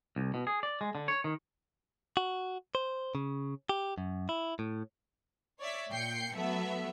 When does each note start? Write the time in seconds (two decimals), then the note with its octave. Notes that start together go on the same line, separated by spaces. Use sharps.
0.16 C2
0.34 B2
0.47 G#4
0.63 D5
0.81 G#3
0.95 D3
1.08 C#5
1.24 D#3
2.17 F#4
2.75 C5
3.15 C#3
3.69 G4
3.98 F#2
4.29 E4
4.59 A2
5.59 C#5 D5 E5
5.90 A#2 G5 G6 C7 C#7
6.36 F#3 A3 B3 E5